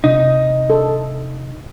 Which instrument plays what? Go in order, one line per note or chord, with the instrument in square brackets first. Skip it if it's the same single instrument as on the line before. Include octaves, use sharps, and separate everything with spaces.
[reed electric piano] C3 [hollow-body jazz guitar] D#4
[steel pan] A4